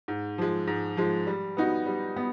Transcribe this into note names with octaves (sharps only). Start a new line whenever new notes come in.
G#2
F3 G#3
G#2
F3 G#3
G3
B3 D#4 F#4
G3
B3